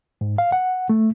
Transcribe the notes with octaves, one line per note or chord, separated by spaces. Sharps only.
G#2
F5
F#5
A3